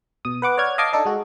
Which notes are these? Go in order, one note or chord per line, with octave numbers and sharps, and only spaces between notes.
B2 D#6
B4 F#5 D6
C#5 D5 F#5 F6 G#6
D#5 F5 A5 D6 G#6 C7
D4 D#4 A4 D#5
G#3 F#4